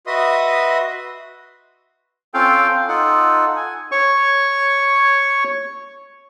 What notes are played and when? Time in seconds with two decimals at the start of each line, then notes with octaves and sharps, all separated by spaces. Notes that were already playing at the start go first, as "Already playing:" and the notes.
0.07 F#4 B4 D#5 E5 C6 D#6
2.34 C4 C#4 F4 A4 F5 G5
2.88 D#4 F4 A4 F#5
3.57 G#5
3.92 C#5 C#6